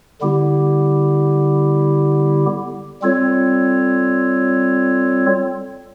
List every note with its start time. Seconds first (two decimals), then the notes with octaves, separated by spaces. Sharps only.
0.21 D3 G3 B3 E4 G4
3.02 G3 C4 F4 A4 C#5